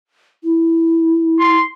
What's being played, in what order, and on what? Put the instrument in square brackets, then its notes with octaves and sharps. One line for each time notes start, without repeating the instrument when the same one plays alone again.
[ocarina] E4
[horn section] C6